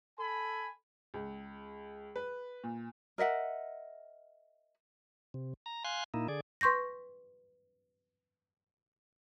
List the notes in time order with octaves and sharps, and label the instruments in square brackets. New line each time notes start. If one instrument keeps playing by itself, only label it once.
[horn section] A4 G#5 B5
[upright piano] C#2
B4
A#2
[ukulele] A#4 D#5 E5 F#5
[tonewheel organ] C3
A#5
F5 G#5 C6 F#6
A#2 A#3 D#4 E4
D3 G#4 D5
[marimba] B4 C6 C#6 G6 A#6